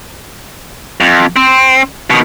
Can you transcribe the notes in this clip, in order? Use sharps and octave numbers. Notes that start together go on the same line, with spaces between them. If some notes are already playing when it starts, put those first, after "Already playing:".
F2
C4
B2 D#3